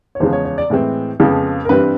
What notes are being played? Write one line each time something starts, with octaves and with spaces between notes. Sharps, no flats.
C#5
E2 C#3 F3 G#3 C5
C#5
C#5
D5
A2 E3 G#3 C4
F2 C#3 F3 G#3 B3
A#4
G2 E3 G3 C4 B4